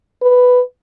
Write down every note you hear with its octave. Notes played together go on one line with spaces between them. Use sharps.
B4